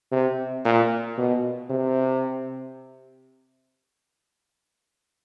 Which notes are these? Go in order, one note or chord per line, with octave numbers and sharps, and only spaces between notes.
C3
A#2
B2
C3